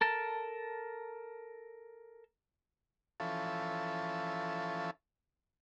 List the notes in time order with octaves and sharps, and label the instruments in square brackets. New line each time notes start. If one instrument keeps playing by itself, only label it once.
[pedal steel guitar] A4 A#4 A5
[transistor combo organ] E3 F3 C#4 A4